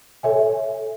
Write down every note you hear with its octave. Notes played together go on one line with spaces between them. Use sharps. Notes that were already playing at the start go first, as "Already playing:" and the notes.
A4 C#5 E5 G#5